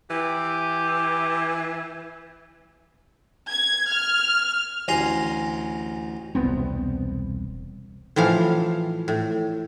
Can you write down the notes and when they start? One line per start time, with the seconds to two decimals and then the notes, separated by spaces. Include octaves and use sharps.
0.11 E3 G4
3.50 G#6
3.92 F6
4.88 A1 D2 G#5 A#5 C6
6.35 E1 C2 B3 C4
8.16 A2 E3 F3 F5
9.08 A2